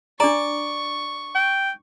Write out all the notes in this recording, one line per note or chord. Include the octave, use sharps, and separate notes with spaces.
D4 D5 A#5 C#6
G5